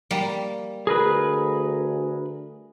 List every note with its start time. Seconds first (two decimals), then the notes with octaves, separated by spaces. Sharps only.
0.11 G3 A#3
0.87 D2 G#4 A#4 B4